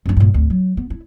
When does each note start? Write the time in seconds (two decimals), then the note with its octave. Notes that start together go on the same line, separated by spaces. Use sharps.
0.06 F#2 D4
0.17 G2 A#2
0.34 G#1 D2
0.50 F#3
0.77 B3
0.90 E4